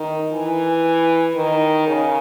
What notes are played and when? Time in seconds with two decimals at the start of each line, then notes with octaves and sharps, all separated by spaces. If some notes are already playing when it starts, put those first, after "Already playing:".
Already playing: D#3
0.32 E3
1.36 D#3
1.87 C#3